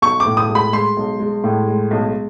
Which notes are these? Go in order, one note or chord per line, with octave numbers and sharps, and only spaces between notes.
B1 C#6
D6
A2
D#6
G#3
B5
G#3 C6
B1
G#3
A2
G#3
B1